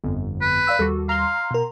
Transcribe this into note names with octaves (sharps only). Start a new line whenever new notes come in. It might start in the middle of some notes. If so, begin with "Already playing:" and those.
G1 F2
B4
D5 F5 E6
D#2 G3 F#4 A4
F5 A#5 C6
B2 A#4